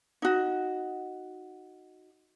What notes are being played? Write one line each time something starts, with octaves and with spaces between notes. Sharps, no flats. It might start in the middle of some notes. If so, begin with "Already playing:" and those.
D#4 F#4